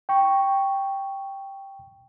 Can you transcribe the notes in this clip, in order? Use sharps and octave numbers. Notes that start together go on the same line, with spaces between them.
G5 C#6